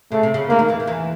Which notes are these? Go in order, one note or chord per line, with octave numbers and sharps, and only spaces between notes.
C#3 A3
C3
C#3
D2 D3 A#3
D#2 D#3
E2 E3
D#3
E2 E3